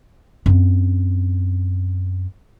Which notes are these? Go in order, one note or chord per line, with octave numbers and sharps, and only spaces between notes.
F#2 C4